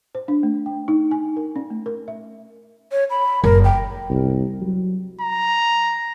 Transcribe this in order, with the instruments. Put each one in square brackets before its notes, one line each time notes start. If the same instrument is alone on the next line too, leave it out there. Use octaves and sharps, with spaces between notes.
[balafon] C5
D4
A3
G5
D#4
G#5
A#4
C#4
A3
A#4
E5
[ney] C#5
B5
[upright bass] F#1 [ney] A#4
[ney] G5
[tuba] C2
F#3
[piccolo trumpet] A#5